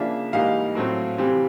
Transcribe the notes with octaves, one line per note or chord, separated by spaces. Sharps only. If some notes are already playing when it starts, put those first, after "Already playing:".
Already playing: C#3 F3 A#3 D4 E5
G#2 E3 G3 A#3 D#4 F5
A2 F#3 A3 C4
C3 E3 G3 C4